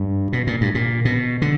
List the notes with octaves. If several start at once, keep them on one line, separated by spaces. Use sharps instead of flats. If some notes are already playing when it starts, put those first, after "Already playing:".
Already playing: G2
B2
A#2
G2
A#2
B2
D3